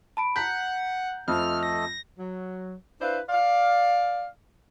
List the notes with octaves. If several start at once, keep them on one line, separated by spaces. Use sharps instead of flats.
A5 B5 D7
F#5 A#5 G6 B6
F2 F3 A3 A4 D#5 F6
A#6
F#3
D4 E4 B4 C5 F5
D5 F5